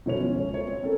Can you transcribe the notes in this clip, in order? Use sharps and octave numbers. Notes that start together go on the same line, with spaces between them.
B2 F3 C#5 F7
C#4
C#2 C#5
C#5
C4
C4 C#4 A4 A#4